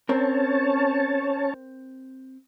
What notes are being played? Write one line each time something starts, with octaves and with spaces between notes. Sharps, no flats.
C4 C#4 A#4 C#5 A5